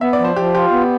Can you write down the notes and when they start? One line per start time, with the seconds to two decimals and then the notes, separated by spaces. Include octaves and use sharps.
0.01 B3 E5
0.13 D5
0.19 F3
0.25 C5
0.36 F3 G4
0.54 F4 G4
0.71 B3